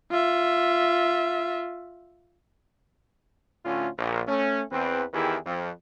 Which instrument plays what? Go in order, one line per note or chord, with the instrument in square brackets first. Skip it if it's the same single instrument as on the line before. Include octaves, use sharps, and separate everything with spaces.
[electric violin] F4 E5
[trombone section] D2 A2 D3 C#4 F4
A#1
A3 C#4
E2 C4 B4
E2 D#3 E4 G4 G#4 B4
F2